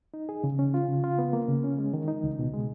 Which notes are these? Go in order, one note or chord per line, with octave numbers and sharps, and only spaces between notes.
D#4
G#4
C#3
C#4
F4
C#3
F4
B3
A#3
C#3
C#4
G#3
D#3
D#4
C#2
B2
G#3